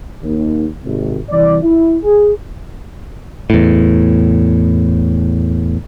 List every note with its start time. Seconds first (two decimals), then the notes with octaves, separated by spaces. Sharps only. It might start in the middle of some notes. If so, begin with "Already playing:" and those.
0.22 D#2
0.83 G#1 C3
1.30 C2 E3 D5
1.62 E4
2.03 G#4
3.50 E2 A2